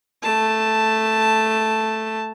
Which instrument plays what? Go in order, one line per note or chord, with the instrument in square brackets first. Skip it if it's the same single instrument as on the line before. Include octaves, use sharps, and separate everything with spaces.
[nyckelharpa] A3 A5